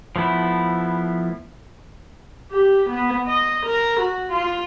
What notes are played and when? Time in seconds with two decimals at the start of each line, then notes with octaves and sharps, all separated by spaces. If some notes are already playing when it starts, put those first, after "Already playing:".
0.16 F3 A3 B3 E4
2.52 G4
2.89 B3
3.26 D#5
3.66 A#4
3.99 F#4
4.32 F4